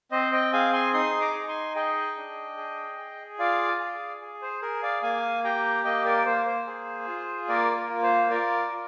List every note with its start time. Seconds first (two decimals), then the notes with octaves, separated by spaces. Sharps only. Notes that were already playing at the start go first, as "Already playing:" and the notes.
0.12 C4 C5 D#5
0.32 D#5 G5
0.53 G#4 F5 G#5
0.73 G#5 C6
0.94 D#4 C6 D#6
1.21 A#5 D6
1.35 D#4
1.48 G#5 C6
1.75 G#4 D#5 G5
2.17 D4
2.57 G#4
2.98 G#4
3.39 F4 D5 F5
3.80 G#4
4.21 G#4
4.42 C5
4.62 G#4 A#4
4.83 D5 F5
5.03 A#3 F5 G#5
5.44 G4 G5 A#5
5.84 A#3 D#5 G5
6.05 A#4 D5
6.25 A#3 C5
6.46 C5
6.67 G#4
7.07 F4
7.48 A#3 A#4 D5
7.76 A#4
7.90 F4
8.03 C5
8.30 F4 A#4 D5
8.71 F4